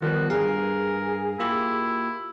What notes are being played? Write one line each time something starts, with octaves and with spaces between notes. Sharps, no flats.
D#3 F3 G3 B3 F#4
G2 G#4 A#4 F5
A#3 E4 F4 G4